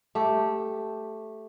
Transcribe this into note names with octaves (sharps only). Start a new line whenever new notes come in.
A3 G4